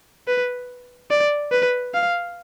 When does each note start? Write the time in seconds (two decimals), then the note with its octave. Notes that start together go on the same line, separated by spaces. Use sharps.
0.28 B4
1.11 D5
1.52 B4
1.94 F5